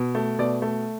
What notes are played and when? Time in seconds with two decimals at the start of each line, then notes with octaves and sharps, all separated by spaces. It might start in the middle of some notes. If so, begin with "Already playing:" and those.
Already playing: B2
0.15 A3
0.39 B2 D5
0.62 A3